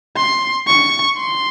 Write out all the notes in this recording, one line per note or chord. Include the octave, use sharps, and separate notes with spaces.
C6
C#6
C6